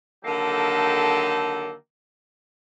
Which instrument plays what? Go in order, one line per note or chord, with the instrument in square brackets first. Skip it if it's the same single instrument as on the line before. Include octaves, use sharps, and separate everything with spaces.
[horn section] D3 D#3 F#3 A#3 G4 A4